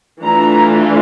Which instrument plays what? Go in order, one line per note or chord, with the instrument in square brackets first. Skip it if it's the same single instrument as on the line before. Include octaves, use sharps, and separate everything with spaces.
[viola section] E3 A3 D4 F4 A#5